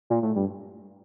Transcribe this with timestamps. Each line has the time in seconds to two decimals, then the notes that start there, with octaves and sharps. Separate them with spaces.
0.10 A#2
0.22 A2
0.36 G2